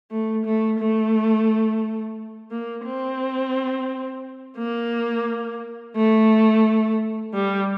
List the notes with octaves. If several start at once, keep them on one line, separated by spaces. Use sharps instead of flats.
A3
A3
A3
A#3
C4
A#3
A3
G3